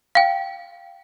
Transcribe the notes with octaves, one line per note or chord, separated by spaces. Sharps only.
F5 G5